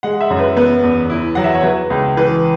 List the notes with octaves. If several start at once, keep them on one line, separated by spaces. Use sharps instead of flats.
G#3 F#5
E5
F#2
B4
B3 B4
E2
E4
F#3 F#5
E5
C#5
F#3 B4
C#2
E3 B4